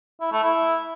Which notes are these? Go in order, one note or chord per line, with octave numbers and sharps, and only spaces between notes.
E4
A3
E4